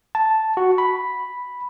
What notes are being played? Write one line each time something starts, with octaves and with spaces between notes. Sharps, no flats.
A5
F#4
B5